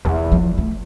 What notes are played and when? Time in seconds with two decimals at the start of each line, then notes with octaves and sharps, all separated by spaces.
0.05 E2 E3
0.32 F3
0.58 A3